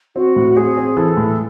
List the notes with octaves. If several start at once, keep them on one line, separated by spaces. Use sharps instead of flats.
C4 F#4
A2
C4 G#4
C4
E3 A4
A2